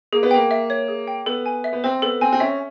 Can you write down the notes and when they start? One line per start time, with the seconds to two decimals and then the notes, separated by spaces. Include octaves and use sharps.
0.13 A#3 G#4
0.23 B3
0.31 A#3 G5
0.51 E5
0.70 C#5
0.88 G#4
1.08 G5
1.26 B3 A4
1.46 G#5
1.64 E5
1.73 B3
1.84 C4 C5
2.02 B3 A4
2.21 C4 G#5
2.32 C4
2.40 C#4 E5